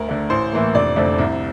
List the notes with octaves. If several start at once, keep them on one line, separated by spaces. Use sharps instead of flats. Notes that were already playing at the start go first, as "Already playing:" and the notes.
Already playing: D2 A#4
D3 A3
A1 C5
A2 E3 A#3
F1 D4 D5
F2 D3 A3
C2